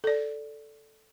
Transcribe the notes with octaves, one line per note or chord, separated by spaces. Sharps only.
A4 D5